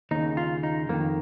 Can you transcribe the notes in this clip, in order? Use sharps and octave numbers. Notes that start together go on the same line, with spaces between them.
D#2 C#3 D#4
F4
D#4
F2 D#3 A#3